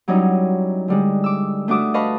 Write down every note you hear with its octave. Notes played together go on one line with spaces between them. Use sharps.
F#3 G3 C#4 D#4 E4
D3 G3 G#3
D6 E6
A3 D4 F#4 E5 D6 D#6
B4 D#5 F5 A5 B5 C#6